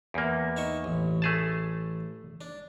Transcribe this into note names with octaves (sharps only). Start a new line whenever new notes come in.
E2 A#3
D#4 E5 C#6
A1
A3 G#4 A5
D4